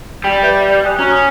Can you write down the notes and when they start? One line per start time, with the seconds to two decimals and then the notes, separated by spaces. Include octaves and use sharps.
0.24 G3 G5
0.43 B4 E5 G6
0.85 G#5 D#6 F#6
0.99 C#4 F#4 A#5 C#6
1.12 D#6